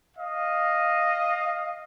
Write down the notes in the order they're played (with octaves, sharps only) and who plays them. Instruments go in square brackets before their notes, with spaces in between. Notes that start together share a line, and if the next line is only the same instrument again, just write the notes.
[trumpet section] D#5 F5